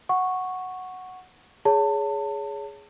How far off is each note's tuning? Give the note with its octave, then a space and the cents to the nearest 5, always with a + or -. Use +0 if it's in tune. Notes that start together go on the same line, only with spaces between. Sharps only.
F#5 +0 C#6 -5
G#4 +0 C#5 +20 A5 +30